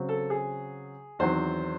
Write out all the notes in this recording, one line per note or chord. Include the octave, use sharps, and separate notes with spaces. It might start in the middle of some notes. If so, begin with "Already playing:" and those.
Already playing: C#3 F#3 C4
A4
G#4
E2 D#3 F#3 C4 C5